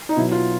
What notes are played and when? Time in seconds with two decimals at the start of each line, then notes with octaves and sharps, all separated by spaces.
0.09 D#4
0.16 B2 F#3 E4
0.32 F4